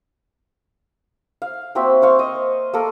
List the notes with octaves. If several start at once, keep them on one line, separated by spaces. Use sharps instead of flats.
F5
A#3 C4 F#4 E5
C5 F5 C#6
D#5
A#3 A4 A#4